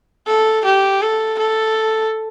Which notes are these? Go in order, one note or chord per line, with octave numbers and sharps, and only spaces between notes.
A4
G4
A4
A4